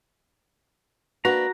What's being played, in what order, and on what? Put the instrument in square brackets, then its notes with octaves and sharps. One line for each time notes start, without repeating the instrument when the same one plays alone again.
[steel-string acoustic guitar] A#3 D4 B4 [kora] F#4 [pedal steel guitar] A#5